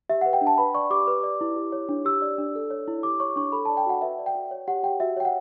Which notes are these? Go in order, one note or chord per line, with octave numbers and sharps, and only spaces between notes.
G4 E5
B4 F#5
G5
D4
A5
B4 B5
D5 C#6
G4 D6
B4
D5
E4
G4
C#5
D4
G4 E6
D5
D4
A4
C#5
E4
G4 D6
C#5 C#6
D4 C#6
A4 B5
D5 A5
G5
F#4 F#5
B4 E5
D5
G5
F#4
C#5
G4 F#5
G4 G5
F#4 E5
C#5 G5
F#5